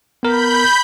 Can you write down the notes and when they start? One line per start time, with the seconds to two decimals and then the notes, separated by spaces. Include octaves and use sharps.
0.23 B3 A#4 B5 G6